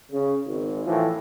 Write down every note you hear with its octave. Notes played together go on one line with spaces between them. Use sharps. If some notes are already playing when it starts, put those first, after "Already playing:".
C#3
G#1
A2 E3 F3